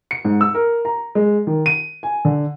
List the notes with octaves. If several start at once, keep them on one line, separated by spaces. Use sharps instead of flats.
C#7
G#2
E6
A#4
A#5
G#3
D#3
D#7
G#5
D3